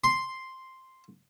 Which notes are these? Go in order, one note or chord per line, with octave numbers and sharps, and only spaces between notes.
C6